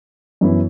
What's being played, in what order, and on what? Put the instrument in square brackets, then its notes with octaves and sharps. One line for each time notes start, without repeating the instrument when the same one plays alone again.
[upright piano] F#2 E3 B3 E4